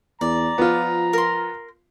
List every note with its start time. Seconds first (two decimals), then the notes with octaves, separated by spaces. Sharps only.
0.21 E2 D5 A#5
0.58 F3 B3 F4
1.13 A#4 C6